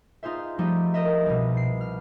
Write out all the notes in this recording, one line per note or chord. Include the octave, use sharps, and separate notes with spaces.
D#4 F4 G#4 C5 E5
F3 G3 A3 D#4 G4
A#4 C5 D#5 E5
C2 B2
C7
F6